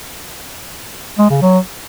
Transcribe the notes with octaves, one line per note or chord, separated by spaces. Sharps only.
G#3
C#3
F#3